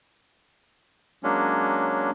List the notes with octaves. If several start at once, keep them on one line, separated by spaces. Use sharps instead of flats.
F#3 G#3 A#3 C#4 D4